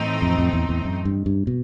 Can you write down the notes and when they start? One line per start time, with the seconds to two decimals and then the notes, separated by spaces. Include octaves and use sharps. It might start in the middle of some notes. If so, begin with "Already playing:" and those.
Already playing: A2 E3 A3 C4 D#4
0.22 F2
0.38 F2
0.53 E2
0.69 E2
0.85 F#2
1.05 G2
1.26 G2
1.47 B2